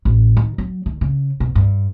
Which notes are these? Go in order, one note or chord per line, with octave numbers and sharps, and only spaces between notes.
A1
D#3
F#3
D#3
C#3
B2
G2